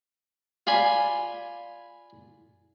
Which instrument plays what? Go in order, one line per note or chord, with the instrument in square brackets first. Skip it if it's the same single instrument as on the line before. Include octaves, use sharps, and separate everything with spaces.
[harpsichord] F4 D5 G#5 B5